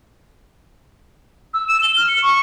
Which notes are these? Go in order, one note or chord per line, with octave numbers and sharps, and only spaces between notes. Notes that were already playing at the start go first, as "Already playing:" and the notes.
E6
E7
G7
F6
C#7
C#6